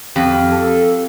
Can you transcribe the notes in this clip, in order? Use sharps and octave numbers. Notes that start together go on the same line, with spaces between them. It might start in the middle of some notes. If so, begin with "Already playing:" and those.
F2 G4
A4